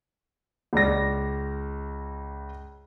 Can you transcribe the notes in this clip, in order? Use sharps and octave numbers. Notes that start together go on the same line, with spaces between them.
C#2 D5 A#6